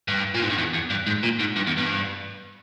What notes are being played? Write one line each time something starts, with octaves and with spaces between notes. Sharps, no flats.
G2
A#2
G#2
G2
E2
E2
G2
G#2
A#2
G#2
G2
E2
G2